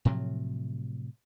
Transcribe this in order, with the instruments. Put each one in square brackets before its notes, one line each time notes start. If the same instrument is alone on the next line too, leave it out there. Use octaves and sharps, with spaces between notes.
[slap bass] A2 C3 F3 F#3